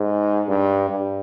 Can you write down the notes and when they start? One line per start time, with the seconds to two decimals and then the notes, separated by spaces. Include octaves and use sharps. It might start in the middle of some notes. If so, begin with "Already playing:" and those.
Already playing: G#2
0.49 G2
0.90 G2